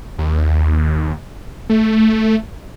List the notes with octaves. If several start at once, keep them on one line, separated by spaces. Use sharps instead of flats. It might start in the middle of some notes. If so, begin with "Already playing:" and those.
D#2
A3